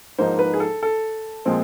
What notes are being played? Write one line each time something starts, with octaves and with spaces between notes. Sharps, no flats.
G#2 F3 A#3 D#4 C5
B4
G#4
A4
A4
A#2 F3 G#3 C4